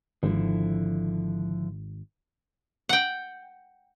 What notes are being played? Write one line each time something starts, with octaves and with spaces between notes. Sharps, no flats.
G#1 D3 F3 E4
F#5 G5